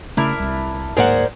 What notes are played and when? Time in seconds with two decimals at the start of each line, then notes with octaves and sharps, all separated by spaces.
0.17 C#3 A3 C#4 D4 E4 A#4
0.40 C2
0.97 D1 G#2 A#3 G#4 A#4 C5 D5 F#5